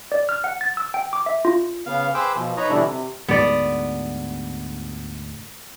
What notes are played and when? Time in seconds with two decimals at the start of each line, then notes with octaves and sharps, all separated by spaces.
0.12 D5
0.29 F6
0.44 F#5
0.61 A6
0.77 E6
0.94 G5
1.13 D6
1.26 E5
1.45 F4
1.86 C#3 B3 F5
2.14 G#4 B4 C5 G5 D6 E6
2.36 B2 F3
2.57 D#4 B4 C#5 D#5 A#5
2.70 B2 D3 E3 G3 D4 E4
2.87 C3
3.29 D2 G#2 B3 D5